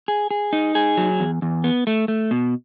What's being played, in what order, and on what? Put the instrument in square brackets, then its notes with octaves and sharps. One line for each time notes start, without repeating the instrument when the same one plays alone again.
[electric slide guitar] G#4
G#4
D#4
G#4
F#3
E2
E2
B3
A3
A3
B2